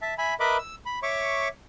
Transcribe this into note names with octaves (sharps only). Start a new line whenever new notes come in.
E5 A5
E5 G#5 B5
A#4 B4 D#5 E5 B5 D6
E6
B5
C#5 E5 C#6 D6